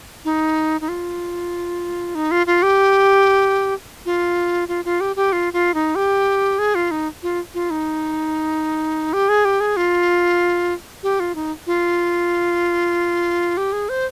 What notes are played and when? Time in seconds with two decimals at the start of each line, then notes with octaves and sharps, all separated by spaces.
0.25 D#4
0.81 D#4
0.89 F4
2.15 D#4
2.31 F4
2.47 F4
2.63 G4
4.05 F4
4.68 F4
4.85 F4
5.01 G4
5.16 G4
5.32 F4
5.53 F4
5.74 D#4
5.95 G4
6.59 G#4
6.75 F4
6.91 D#4
7.23 F4
7.54 F4
7.70 D#4
9.13 G4
9.29 G#4
9.45 G4
9.60 G#4
9.77 F4
11.03 G4
11.20 F4
11.35 D#4
11.67 F4
13.57 G4
13.73 G#4
13.89 C5